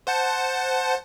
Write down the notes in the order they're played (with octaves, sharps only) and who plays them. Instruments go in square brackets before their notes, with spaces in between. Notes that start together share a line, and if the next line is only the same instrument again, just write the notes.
[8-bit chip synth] C5 F#5 A5